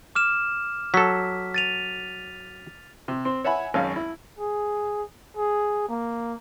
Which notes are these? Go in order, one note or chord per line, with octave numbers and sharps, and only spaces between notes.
D6 F6 E7
F#3 A4 B6
A6 D#7 F7
C3
C4 C6
C#5 E5 F#5 G#5 B5
G#1 F#2 C#4 F5
E4
G#4
G#4
A#3